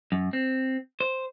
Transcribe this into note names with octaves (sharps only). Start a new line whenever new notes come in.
F#2
C4
C5